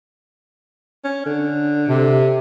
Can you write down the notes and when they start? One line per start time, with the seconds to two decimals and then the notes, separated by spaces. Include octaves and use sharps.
1.05 C#4
1.26 D3
1.89 C3